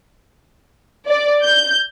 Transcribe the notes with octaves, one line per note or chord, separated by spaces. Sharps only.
D5
G6